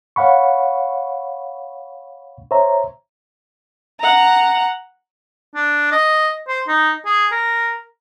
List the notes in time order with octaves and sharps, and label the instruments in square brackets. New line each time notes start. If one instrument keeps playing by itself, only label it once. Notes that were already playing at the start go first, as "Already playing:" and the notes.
[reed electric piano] C#5 F5 F#5 B5 C#6
C5 C#5 E5 A#5
[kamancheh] F#5 A#5
[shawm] D4
D#5
C5
D#4
G#4
A#4